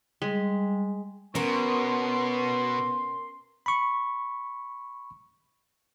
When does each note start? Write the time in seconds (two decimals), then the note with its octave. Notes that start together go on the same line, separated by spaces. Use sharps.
0.22 G3 G#3
1.35 B2 B3 C#4 A#4 C6
3.66 B5 C#6